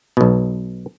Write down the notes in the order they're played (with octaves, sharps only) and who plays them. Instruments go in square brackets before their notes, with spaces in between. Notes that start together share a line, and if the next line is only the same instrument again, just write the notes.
[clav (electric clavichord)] B1 B2